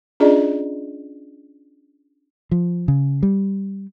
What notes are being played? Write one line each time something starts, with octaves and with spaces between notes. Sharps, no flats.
C#4 D4 F4 G#4 D5 D#5
F3
C#3
G3